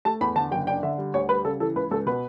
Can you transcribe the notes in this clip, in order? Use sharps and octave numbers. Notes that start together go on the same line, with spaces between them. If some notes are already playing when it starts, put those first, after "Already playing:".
A3 A5
E2 B5
D3 A5
F#1 G5
D4 G5
D3 E5
G3
D2 C#5
G3 B4
C#3 A4
E3 A4
C#2 B4
C#2 A4
B2 B4